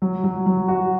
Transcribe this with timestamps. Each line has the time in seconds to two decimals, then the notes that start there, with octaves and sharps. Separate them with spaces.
0.02 F#3
0.24 F#3
0.46 F#3
0.68 F#4